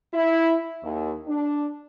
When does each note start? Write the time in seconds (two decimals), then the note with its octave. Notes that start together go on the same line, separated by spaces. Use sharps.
0.13 E4
0.83 D#2
1.27 D4